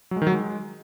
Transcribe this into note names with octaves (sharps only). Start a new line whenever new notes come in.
F#3
G#3
D#3
F#3
G#3